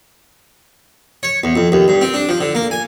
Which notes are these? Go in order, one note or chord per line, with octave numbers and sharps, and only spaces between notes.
C#5
E2
F2
D#2
G2
C4
D4
F3
D3
A#3
G#5